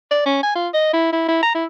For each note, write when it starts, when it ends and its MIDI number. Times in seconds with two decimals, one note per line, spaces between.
0.11 0.26 74
0.26 0.39 61
0.43 0.53 80
0.56 0.68 65
0.74 0.89 75
0.93 1.12 64
1.13 1.27 64
1.28 1.41 64
1.43 1.53 82
1.55 1.65 64